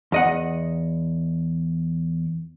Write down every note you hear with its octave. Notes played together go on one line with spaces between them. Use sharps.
E2 D#5 F#5